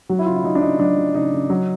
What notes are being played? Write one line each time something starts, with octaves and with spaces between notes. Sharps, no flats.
F#3 F#4
E4
C#3 F4
E4
F#3 D#4
D4
C#3 D#4
F#3 D4
F#3
C#3 D#4
C#3
F#3